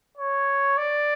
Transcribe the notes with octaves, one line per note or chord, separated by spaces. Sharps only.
C#5
D5